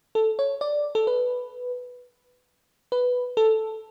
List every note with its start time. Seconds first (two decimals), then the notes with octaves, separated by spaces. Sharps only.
0.15 A4
0.39 C#5
0.61 D5
0.95 A4
1.07 B4
2.92 B4
3.37 A4